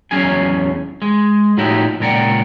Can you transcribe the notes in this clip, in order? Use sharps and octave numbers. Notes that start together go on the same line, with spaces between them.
E2 F#3 C#4 G#4 G#5
G#3
A2 F3 D#4 E4 F#4 G4
C#2 A#2 A#4 D5 F#5 G5